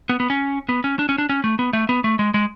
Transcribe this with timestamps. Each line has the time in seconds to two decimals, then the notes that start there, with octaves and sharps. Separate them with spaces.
0.09 B3
0.20 B3
0.30 C#4
0.69 B3
0.84 C#4
0.99 D4
1.09 C#4
1.18 D4
1.29 C#4
1.44 A3
1.59 B3
1.73 A3
1.89 B3
2.04 A3
2.19 G#3
2.34 G#3